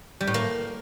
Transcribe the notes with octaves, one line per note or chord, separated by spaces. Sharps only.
G3
A2
A#3